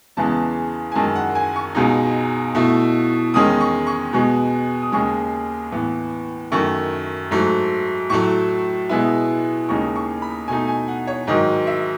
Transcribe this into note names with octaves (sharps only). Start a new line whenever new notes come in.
E2 C#3 E3 G#3 B3 A5
G#5
F#2 D#3 G#3 A5
F#5
G#5
C#6
C#2 B2 G#3 D#4
B2 A3 E4
E2 D#3 G#3 C#4 D#6
C#6
C#6
B2 G#3 B3 C#6
D#6
D#2 C#3 G#3 C#6
A2 E3 B3
F#2 D#3 A3 C#6
G#2 F#3 A3
A2 F#3 A3 C#6
B2 G#3 B3 E4
D#2 C#3 G#3 D#4 C#6
C#6
B5
B2 A3 D#4 G#5
G#5
F#5
C#5
G#2 D#3 F#3 D#5
E5